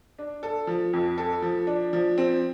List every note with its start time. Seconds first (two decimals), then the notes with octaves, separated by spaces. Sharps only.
0.19 D4
0.43 A4
0.67 F3
0.93 F2
1.18 A4
1.42 F3
1.67 D4
1.93 F3
2.18 C4